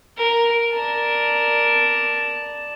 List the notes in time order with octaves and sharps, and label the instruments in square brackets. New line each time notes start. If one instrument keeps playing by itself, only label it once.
[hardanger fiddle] A#4
[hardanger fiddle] A#4 [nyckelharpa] D5 A5